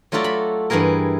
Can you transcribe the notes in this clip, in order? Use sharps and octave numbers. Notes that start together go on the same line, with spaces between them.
F#3 A3 F4 F#4 A4 D5
B5
G2 E3 E4 G#4 A#4